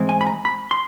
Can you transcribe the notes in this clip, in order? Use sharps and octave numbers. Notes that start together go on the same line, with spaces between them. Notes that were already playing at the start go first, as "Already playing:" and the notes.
Already playing: G#2 E3 G#3 C4
G#5
B5
A#5
B5
C6